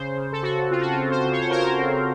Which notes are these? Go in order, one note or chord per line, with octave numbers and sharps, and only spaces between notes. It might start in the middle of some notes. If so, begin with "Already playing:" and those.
Already playing: C#3 C5
C#3
A4
C#3 F#4
C4 F4
F#4
F4
C4
C5
C#3
C#5
C5
C#3 A#4
C5
C4